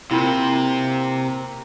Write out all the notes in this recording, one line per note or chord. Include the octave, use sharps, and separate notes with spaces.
C3 A#3 C4 E4 F4 A#4